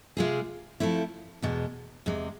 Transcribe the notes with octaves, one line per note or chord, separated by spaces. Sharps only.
C3 G#3 C4 F4 G#4
F3 A3 C4 E4
E2 B2 G#3 B3
E2 C3 G#3